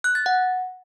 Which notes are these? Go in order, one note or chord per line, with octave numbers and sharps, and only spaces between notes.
F#6
A6
F#5